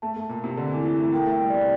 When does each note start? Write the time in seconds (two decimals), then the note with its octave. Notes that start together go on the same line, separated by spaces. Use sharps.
0.02 A3 A5
0.16 A3 A5
0.29 A#2
0.39 C3 A5
0.57 D3 A4
0.71 E3
0.76 E4
0.86 E3
0.95 A3 E4
1.12 A#3 G5
1.27 A3 G5
1.40 G3
1.50 C3 D5